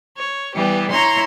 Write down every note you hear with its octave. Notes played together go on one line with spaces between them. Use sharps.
C#5
E3 G3 B3 G4
E4 C#5 A#5 C6